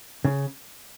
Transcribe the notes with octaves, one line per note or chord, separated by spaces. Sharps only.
C#3